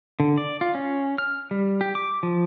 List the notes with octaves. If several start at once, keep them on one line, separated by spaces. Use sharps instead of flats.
D3
D5
F4
C#4
F6
G3
G4
D6
F3